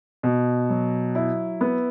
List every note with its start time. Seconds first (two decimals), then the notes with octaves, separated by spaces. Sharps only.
0.23 B2
0.70 F#3
1.15 E4
1.61 B3